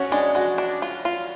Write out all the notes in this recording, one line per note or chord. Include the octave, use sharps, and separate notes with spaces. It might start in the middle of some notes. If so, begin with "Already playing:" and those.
Already playing: C#4 F#4 C#5
G#3 D4 D5
G#3 F#4 F#5
D4
F4
F4